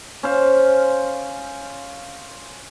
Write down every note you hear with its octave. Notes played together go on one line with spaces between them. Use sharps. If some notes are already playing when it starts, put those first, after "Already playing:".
C#4 C5 F5